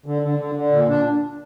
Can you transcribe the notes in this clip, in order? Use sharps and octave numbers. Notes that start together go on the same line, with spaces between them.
D3
D3
D3
D3
A#2
D4